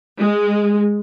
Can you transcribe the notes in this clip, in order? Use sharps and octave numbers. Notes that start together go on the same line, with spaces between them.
G#3